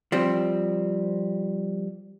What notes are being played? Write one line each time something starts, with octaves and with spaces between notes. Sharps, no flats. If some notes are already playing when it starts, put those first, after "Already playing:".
F3 G3 C4